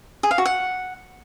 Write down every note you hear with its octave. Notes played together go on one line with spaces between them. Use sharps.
G#4
F5
F#4
F#5